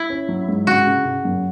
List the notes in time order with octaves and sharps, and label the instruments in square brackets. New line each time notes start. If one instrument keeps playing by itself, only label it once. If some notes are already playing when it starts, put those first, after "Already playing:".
Already playing: [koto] E4
[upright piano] C#4
F#3
G#2
[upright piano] C#3 [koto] F#4
[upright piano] C#3
C#3
F#2